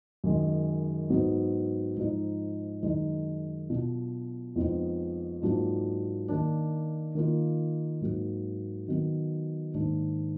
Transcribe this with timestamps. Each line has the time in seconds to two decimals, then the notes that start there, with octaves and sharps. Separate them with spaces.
0.24 F#2 D#3 G#3
1.10 G#2 F#3 B3
1.97 G#2 F3 G#3 D#4
2.83 F#2 D#3 G#3 D#4
3.69 B2 F#3 D4 F4
4.56 F2 F3 G#3 B3 D#4
5.42 G#2 F#3 A#3 D4 F4
6.29 D#3 A#3 D4
7.15 D#3 A#3 F4
8.01 G#2 F#3 A#3
8.88 D#3 F#3 B3
9.74 G#2 D#3 A#3 D4